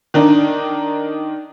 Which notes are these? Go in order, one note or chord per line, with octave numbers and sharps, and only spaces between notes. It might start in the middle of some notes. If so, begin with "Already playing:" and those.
D#3 D4 D#4